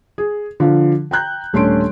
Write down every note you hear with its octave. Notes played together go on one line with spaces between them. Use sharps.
G#4
D3 F3 F4
G5 A#5 F#6 G6
D#1 A3 C#4 D4 C6 D7